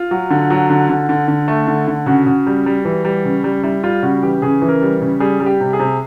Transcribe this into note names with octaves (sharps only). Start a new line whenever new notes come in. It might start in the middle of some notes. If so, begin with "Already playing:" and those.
Already playing: F4
F#3
D3
F#3
D3
D3
D3
D3
A3
D3
D3
C#3 F#4
C#3
G3
G3
E3
G3
C#3
G3
G3 E4
G3 F4
C#3 F#4
E3 G4
C#3 G#4
E3
A#4
G3
C#3
G3 G#4
G3
G4
C3
G#4
C3